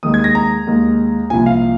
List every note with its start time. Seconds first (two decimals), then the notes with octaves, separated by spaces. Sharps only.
0.03 D#2 D#3 G#3 D#6
0.14 G#6
0.24 A#6
0.35 A#5
0.67 D#2 D#3 G#3
1.30 C2 A#2 F3 G#5
1.46 F5